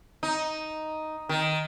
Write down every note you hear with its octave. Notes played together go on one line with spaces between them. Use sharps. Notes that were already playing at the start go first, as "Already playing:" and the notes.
D#4
D#3